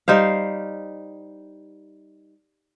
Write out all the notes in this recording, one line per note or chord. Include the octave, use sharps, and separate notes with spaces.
G3 D#4 C5 F5